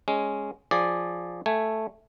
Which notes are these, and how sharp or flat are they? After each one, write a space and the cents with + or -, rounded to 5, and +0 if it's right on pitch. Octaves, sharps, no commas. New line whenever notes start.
G#3 +0 C#4 +0
F3 +0 G#4 -15 D5 +0
A3 +0 G#5 +0